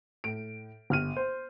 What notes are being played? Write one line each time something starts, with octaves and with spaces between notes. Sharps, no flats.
A2 D7
G1 F6 D#7
C5